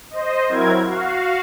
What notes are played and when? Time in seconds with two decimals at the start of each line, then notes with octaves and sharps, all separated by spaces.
0.11 C5 D#5
0.48 F#3 C4 E4 A#4 G#6
0.83 F#4 F5